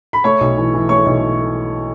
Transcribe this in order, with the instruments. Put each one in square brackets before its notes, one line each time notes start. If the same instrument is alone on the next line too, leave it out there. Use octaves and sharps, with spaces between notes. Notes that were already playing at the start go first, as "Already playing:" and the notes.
[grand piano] B5
A3 C#5 C#6
B1
E3
E3
A3 C#5 C#6
B1